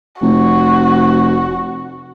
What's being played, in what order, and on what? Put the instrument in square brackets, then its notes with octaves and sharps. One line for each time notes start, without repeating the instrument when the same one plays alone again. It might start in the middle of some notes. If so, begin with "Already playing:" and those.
[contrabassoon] F1 [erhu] F#4